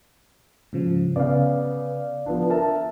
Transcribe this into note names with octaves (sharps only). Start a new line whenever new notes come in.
G#2 C#3 F3
C#3 B3 D5 F5
F3 B3 D4
A#4 E5 A5